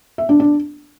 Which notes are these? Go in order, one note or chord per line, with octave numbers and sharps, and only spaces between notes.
E5
D4
D4